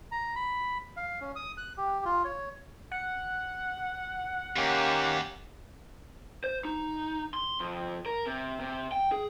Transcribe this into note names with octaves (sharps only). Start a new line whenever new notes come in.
A#5
B5
F5
C#4
D#6
F#6
G4
F4
C#5
F#5
D#2 A#3 C#4 G4
C5
D#4
C6
F2
A#4
C3
C3
G5
G#4